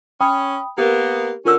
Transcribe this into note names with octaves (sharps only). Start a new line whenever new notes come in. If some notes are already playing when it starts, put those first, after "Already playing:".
C#4 G5 B5 D#6
A#3 B3 G4 A#4
D3 C#4 F4 A#4 E6